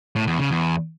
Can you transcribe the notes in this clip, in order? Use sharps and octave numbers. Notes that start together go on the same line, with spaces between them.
A2
E2
C#3
E2